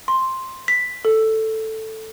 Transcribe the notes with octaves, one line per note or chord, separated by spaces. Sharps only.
C6
B6
A4